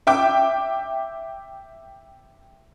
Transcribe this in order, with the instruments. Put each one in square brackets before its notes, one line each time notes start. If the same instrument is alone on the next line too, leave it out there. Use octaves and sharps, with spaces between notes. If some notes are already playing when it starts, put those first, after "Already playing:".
[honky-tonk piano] E5 G5 D6